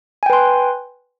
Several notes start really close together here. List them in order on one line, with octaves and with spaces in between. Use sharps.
G#5 G5 B4 C6